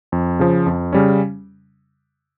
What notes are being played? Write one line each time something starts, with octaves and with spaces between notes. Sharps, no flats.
F2
C#3 F3
F2
C#3 G3 C#4